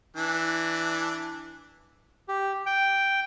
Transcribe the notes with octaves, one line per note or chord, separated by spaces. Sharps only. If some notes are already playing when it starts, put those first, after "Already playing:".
E3 D4
G4
G5